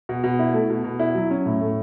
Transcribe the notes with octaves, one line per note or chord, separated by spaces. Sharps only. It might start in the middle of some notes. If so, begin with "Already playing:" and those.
B2
B2
E4
A3
B2
B2
E4
F#3
C#4
A2
A3